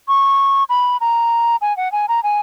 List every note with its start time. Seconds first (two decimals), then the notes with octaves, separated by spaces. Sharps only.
0.08 C#6
0.69 B5
1.01 A#5
1.61 G#5
1.77 F#5
1.92 G#5
2.09 A#5
2.23 G#5